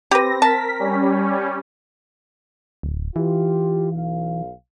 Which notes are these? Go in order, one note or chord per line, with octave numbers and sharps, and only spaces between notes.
C4 G4 B4 A#6
A#4 A5 B6
G3 C#4
D1
E3 F4 G4
B1 F5